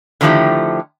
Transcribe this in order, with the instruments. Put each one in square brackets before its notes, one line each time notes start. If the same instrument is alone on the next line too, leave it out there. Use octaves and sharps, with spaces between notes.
[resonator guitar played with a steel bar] D3 D#3 F3 A3 E4 G4